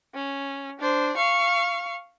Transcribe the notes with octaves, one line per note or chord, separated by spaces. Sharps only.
C#4
D4 C5
F5 C#6